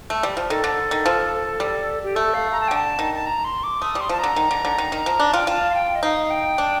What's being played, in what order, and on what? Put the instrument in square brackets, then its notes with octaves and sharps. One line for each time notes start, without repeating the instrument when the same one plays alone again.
[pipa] A3
G3
F3
[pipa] D#3 [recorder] A4
[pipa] D3
D#3
F3
G3
[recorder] G4
[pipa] A3 [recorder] A4
[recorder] F5
A#5
A5
G5
[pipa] D3
[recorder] A5
[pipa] D#3
[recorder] A5
A#5
C6
D6
[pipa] A3 [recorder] D#6
[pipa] G3
[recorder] C6
[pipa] F3 [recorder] A5
[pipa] D3 [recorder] A#5
[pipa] D#3
D3
D3
D#3
D#3
F3
D4
[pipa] F4 [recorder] G5
[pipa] F4 [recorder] A5
[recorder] F5
G5
D#5
[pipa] D#4 [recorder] F5
[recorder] G5
[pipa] D4